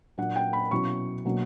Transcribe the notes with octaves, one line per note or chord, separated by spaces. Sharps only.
A#2 F#3 A#3 D4 F#5
G5
B5
B2 F#3 C#4 E4 C#6
B2 F#3 A#3 D4